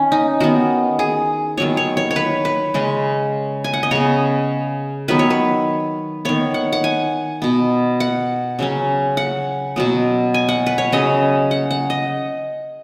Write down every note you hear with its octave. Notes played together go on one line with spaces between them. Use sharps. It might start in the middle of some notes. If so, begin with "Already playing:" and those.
Already playing: D#3 C#4
D#4
D#3 B3 F#4
G#4
D#3 F#3 B3 C#5
C#5
C#5
C#5
B4
B4
C#3 G#3 C#4
G#5
F#5
D#5
C#3 B3 C#5
D#3 F#3 B3 B4
C#5
B4
D#3 B3 C#5
F#5
F#5
G#5
B2 B3
F#5
C#3 F#3 C#4
F#5
B2 F#3 B3
G#5
F#5
B4
C#5
C#3 F#3 C#4 D#5
F#5
F#5
D#5